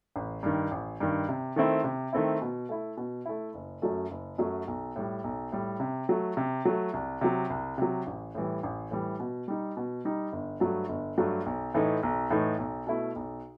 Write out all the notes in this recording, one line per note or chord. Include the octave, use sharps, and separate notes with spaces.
A1
G2 D#3
A1
G2 D#3
C3
D#3 A3 C4 E4
C3
D#3 A3 C4 E4
B2
A3 E4
B2
A3 E4
F#1
F#2 F#3 A3
F#1
F#2 F#3 A3
B1
A2 G3
B1
A2 G3
C3
F#3 A3
C3
F#3 A3
C2
C3 F#3
C2
C3 F#3
A1
A2 E3 G3
A1
A2 E3 G3
B2
G3 D#4
B2
G3 D#4
G1
G2 F#3 A3
G1
G2 F#3 A3
B1
A2 E3 A3 D#4
B1
A2 E3 A3 D#4
B1
B2 A3 E4
B1